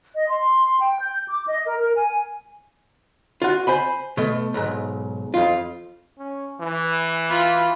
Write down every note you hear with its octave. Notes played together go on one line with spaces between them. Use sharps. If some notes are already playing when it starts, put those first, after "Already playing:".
D#5
C6
G5
G6
D6
D#5
A#4
A#4
G#5
F4 F#4
C5 G#5 B5
B2 A3
B1 G#2
F2 F4
C#4
E3
F4 B5